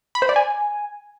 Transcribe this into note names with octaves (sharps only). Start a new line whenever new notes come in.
B5
C5
D5
G#5